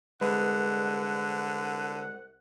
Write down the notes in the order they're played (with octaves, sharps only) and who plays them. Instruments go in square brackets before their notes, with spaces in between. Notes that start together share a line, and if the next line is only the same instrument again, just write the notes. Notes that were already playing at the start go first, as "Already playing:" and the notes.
[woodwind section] C2 F#5 [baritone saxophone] D3 [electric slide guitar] G#3 [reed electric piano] B4